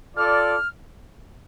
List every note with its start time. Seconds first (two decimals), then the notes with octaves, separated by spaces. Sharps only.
0.16 F4 A4 D5 F6